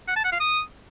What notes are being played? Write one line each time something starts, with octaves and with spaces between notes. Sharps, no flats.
F#5
A5
F#5
F5
D#6